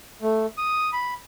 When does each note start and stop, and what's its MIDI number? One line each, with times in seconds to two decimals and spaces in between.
0.22 0.46 57
0.58 0.90 87
0.93 1.14 83